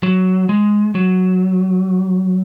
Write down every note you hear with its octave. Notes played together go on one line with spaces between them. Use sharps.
F#3
G#3
F#3